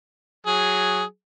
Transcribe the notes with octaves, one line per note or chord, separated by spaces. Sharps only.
F#3 G#4